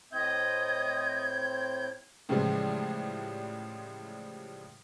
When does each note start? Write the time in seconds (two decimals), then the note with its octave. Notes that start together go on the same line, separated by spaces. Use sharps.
0.12 A2 C4 D#5 G6 G#6
2.29 A2 C#3 E3 F3 G3 G#3